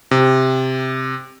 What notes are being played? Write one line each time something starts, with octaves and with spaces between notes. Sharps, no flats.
C3